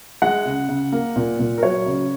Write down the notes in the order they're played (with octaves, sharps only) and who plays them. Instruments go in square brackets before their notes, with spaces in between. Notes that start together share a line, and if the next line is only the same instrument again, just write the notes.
[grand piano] G#3 F#5
C#3
C#3
A#3
A#2
A#2
A#4
F#3 C#5
C#3